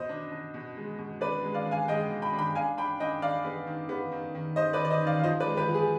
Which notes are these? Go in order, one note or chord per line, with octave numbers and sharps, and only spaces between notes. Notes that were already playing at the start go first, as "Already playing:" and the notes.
Already playing: B2 C5 D#5
D4
D4
B2
G#3
B2
D4 B4 D5
G#3
D5 F5
D4
F5 G#5
G#3 D#5 G5
B2
G5 B5
D4
G5 B5
D4 F5 G#5
D4 G5 B5
D4 D#5 G5
D4 D5 F5
B3
D#3
B3
D#3
D#3
D#3 C5 D#5
B4 D5
D#3
D5
C5 D#5
D#3 D5 F5
F5
F3 C5 D#5
B4 D5
G#3
G4 B4
F3
G#4